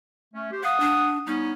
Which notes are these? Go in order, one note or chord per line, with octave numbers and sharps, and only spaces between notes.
A3 C#4
G4 C5
F5 F#5 D#6
D4
G3 B3 C#4 D#4